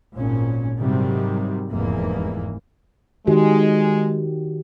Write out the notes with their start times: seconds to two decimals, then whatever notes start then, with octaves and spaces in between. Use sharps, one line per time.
0.15 G#1 A#2 C#4
0.79 G#2 C3 D#3 F#3 G3
1.71 F1 E2 G#2 E3 A#3
3.27 D#3 G#3 F#4 G4